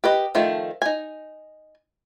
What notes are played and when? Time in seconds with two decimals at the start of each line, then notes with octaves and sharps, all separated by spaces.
0.04 G4 B4 D#5
0.35 D#3 F3 A3
0.82 D#4 G#5